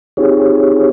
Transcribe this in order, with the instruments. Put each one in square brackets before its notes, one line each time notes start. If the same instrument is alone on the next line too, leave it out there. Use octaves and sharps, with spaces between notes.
[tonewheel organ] C4 D#4 F4 G4 G#4 C#5